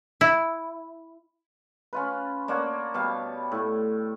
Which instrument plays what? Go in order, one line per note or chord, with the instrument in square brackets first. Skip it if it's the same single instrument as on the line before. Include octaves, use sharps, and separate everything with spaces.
[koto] E4
[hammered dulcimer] C#4 F4 B4
A#3 D4 C#5 F#5
B2 G3 F5
A2